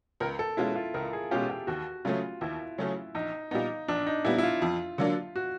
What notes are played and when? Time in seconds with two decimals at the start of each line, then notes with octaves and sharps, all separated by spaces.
0.20 C#2 A#4
0.39 A4
0.57 B2 G#3 C#4 E4 F4
0.75 F4
0.94 C#2 A#4
1.13 G#4
1.31 B2 G#3 C#4 F4 G4
1.50 G4
1.67 D#2 F#4
2.05 C#3 F#3 A3 C#4 F4
2.41 D#2 E4
2.78 C#3 F#3 A3 C#4
3.15 A#1 D#4
3.51 A#2 G3 B3 D#4
3.88 A#1 D4
4.07 D#4
4.25 A#2 G3 B3 E4
4.38 E4
4.43 F4
4.62 F2
4.98 D3 F#3 A#3 D4
5.36 F#4